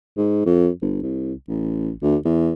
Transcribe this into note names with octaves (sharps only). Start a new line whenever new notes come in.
G#2
F2
G1
C2
A1
D2
E2